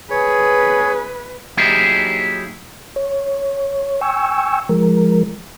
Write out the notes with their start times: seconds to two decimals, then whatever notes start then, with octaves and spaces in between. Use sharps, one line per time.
0.11 G#4 B4 C#5
1.57 F#3 A#3 D#4 E4 G4 G#4
2.96 C#5
4.01 G5 G#5 C#6 E6
4.69 F3 G#3 A#4